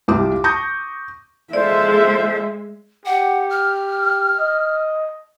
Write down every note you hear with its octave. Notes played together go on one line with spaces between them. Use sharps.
C2 F4 G4 D6
C#6 D#6 G6 A#6
G#3 F4 A4 C5 D5 E5
G4 F#5
F6
D#5